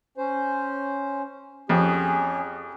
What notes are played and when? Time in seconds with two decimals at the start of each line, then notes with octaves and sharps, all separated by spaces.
0.17 C#4 C5
1.69 F2 C#4 G4 G#4